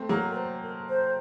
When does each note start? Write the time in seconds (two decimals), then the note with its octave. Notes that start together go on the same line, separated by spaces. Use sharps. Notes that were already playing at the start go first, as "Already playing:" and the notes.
Already playing: A3 C4
0.09 F#3 A#3
0.32 A#4
0.36 C5
0.63 A#4
0.89 C5